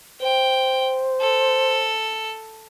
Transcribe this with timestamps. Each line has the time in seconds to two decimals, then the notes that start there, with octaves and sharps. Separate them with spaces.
0.21 C5 G5
1.22 A4